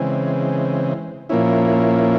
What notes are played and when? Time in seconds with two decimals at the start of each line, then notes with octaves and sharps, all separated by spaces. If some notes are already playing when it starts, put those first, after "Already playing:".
Already playing: C#3 E3 G#3 C4
1.29 A#2 F3 A#3 C#4 E4